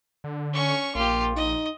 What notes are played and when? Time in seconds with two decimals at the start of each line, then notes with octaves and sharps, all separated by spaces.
0.24 D3
0.53 C#4 C#6
0.95 A#1 A#3 F4 G4
1.36 D#4 D#5